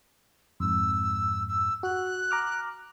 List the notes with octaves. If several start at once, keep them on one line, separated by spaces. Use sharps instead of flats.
F2 G#2 E6
E6
F#4 F#6
A#5 D6 F6